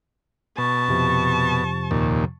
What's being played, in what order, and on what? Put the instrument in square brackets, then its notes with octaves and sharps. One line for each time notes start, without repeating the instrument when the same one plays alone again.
[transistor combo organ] B2 [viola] A5 C#6
[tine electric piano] F2 C3 F3
[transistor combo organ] D#2 A#2